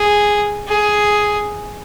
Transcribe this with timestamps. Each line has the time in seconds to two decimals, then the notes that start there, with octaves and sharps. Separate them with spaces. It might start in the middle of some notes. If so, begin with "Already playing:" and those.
Already playing: G#4
0.68 G#4